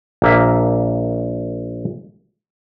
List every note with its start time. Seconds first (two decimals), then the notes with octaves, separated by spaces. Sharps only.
0.22 A#1 A#3 E5